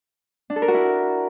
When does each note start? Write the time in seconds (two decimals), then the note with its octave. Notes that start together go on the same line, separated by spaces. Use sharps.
0.50 D4
0.56 A4
0.62 A#4
0.68 F#4
0.74 E4